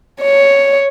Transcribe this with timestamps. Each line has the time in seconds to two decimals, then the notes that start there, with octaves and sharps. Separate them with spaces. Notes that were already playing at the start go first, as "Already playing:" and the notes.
0.22 C#5